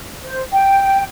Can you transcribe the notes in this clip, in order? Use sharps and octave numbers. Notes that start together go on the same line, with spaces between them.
C5
G5